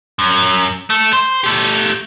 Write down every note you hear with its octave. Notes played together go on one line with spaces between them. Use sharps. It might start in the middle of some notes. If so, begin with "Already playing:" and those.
F#2
A3
C5
A3 G4